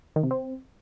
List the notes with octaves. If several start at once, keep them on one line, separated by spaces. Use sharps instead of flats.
D#3
C3
C4